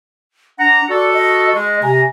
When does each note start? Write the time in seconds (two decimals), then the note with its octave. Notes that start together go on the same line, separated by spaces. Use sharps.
0.59 D4 F#5 A#5
0.89 F#4 A4 D5
1.13 D#5
1.53 G#3 D#5
1.82 C3 G#5 A#5